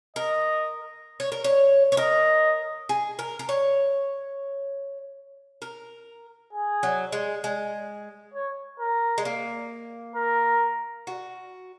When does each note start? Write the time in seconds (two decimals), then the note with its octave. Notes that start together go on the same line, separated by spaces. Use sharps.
0.16 A#4 D#5
1.20 C#5
1.32 A#4
1.44 C#5
1.92 C#5
1.97 A#4 D#5
2.89 G#4
3.19 A#4
3.39 A#4
3.49 C#5
5.62 A#4
6.53 G#4
6.83 F#3
7.12 G#3
7.44 G#3
8.34 C#5
8.80 A#4
9.18 G#3
9.25 A#3
10.15 A#4
11.07 F#4